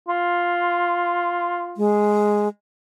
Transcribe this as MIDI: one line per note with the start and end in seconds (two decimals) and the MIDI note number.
0.09 1.81 65
1.77 2.48 56